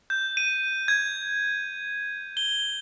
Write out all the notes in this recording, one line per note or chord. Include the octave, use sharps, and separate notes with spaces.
G6
D#7
G#6
G7